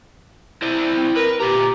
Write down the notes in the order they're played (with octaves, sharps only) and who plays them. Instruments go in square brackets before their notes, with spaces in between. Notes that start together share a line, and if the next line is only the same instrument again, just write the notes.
[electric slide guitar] E4 C5 D5
[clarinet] C4
[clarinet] A#4 [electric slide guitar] B4
[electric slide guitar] A#2 A#5 [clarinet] G4